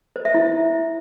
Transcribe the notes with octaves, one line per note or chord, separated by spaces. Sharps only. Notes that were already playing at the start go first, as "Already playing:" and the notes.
C5
E5
E4